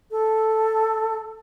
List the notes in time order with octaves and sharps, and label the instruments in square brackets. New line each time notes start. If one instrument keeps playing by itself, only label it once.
[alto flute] A4